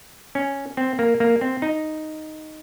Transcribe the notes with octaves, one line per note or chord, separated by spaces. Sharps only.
C#4
C4
A#3
A#3
C4
D#4